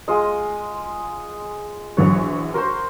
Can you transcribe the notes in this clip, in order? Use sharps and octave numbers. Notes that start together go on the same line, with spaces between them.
G#3 F4 D#5
A#1 E3 F#3 F#4 C#6
F#4 A#4 C5 C6